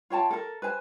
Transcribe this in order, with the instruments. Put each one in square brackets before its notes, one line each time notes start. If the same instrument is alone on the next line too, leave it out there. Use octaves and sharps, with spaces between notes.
[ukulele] F4 C#5 G5 A5
A4 A#4
B4 C5 G#5